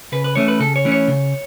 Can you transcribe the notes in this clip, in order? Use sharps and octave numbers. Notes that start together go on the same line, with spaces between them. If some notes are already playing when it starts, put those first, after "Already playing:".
C#3 B4
B4
E3 A3 C#4 C#5
B4
C#3 A4
C#5
E3 A3 C#4
C#5
C#3